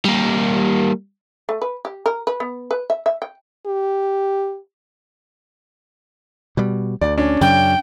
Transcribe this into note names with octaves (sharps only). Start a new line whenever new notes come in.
G3 A#3
A3
B4
G4
A#4
B4
B3
B4
E5
E5
G5
G4
B2 G3
D2 D5
C#4 D4
F#2 C#3 G5